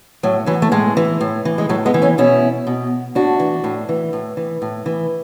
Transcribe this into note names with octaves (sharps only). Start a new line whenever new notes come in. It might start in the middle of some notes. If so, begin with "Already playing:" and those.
A2 F#3
E3 F#3
A3
A2 G#3
E3
A2
E3
G#3
A2 F#3 A3
G#3 B3
E3
A3 C#4
B2 C#4 E4
B2
A2 D4 F#4
E3
A2
E3
A2
E3
A2
E3